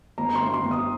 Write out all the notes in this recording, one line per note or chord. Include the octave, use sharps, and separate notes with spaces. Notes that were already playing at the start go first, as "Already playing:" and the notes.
G1 A#5
A#5
C6
G1
C6
G1
D#6